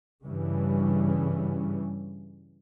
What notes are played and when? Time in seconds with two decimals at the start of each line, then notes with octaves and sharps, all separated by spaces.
0.25 G2 C#3 E3 G3 C#4